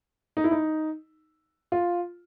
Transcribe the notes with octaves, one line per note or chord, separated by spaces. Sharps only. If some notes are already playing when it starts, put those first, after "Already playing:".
D#4
E4
D#4
F4